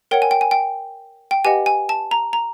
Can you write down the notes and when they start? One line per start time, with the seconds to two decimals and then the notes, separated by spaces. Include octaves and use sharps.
0.11 A#4 C#5 F#5 G5
0.22 G#5
0.31 G5
0.41 G#5
0.51 G5
1.31 G5
1.45 G4 B4 D#5 F#5 G#5
1.66 G#5
1.89 A5
2.11 A#5
2.33 A#5